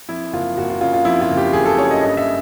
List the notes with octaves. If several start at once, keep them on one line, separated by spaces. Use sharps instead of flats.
F2 E4
F#1 F4
F#1 F#4
F4
C#3 F4
F4
F2 E4
F4
F#1
G4
F#1 G#4
A4
C#3 C#5
D#5
G2 D#5
E5